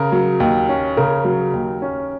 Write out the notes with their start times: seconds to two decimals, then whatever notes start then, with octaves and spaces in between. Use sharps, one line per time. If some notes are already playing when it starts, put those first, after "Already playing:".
Already playing: C#3 A#4
0.12 F#3
0.40 D#2
0.69 C#4
0.97 C#3 A#4
1.25 F#3
1.53 D#2
1.82 C#4